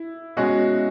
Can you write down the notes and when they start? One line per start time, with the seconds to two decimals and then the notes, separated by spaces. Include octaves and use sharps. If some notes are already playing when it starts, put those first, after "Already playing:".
Already playing: E4
0.37 B2 G#3 C#4 F#4